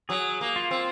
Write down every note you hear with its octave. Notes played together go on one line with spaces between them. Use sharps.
F#3 G#4
A#3
F4
C4